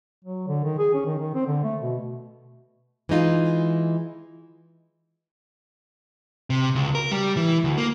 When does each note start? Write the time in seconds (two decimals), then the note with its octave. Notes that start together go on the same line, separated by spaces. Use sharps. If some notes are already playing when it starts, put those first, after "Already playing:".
0.25 F#3
0.48 D3
0.64 D#3
0.79 G#4
0.94 C#4
1.06 D#3
1.19 D#3
1.35 C4
1.46 D3
1.64 A3
1.81 B2
3.09 E3 G#3 D#4 F4
6.50 C3
6.75 C#2
6.95 A#4
7.11 G3
7.37 E3
7.64 D2
7.78 A#3